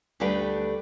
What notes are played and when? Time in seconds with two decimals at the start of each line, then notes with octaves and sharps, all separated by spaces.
0.20 D2 G3 A3 D4 B4 G5